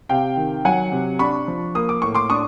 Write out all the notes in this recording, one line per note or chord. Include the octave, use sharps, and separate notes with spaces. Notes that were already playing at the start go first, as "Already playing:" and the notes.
C3 F5 G5
D#3
F#3 F#5 G#5
C3
D4 B5 C#6
F3
A#3 D#6
D6
A2 C#6
C6 D6
D4 C#6 D#6